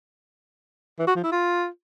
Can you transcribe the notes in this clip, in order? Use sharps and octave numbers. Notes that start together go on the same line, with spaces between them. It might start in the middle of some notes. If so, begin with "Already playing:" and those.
E3
F#4
F3
E4
F4